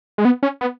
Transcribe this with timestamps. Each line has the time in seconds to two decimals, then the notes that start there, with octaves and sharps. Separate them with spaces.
0.18 G#3
0.25 B3
0.43 C#4
0.61 B3